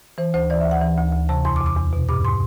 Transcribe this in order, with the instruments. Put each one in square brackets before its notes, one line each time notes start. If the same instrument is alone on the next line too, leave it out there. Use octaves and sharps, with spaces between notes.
[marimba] E3 C5
D2 C5
E3 D5
D2 E5
F#5
E3
D2
D2
C3 A5
E2 C6
D6
E2
D6
E2
B2
G2 D6
C6